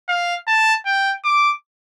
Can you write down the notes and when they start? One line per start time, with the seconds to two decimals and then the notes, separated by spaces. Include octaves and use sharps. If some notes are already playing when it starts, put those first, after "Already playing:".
0.08 F5
0.48 A5
0.86 G5
1.25 D6